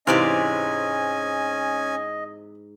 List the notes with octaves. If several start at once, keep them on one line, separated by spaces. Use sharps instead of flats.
G#2 C3 E3 C#4 D5 D#5 F5 G#5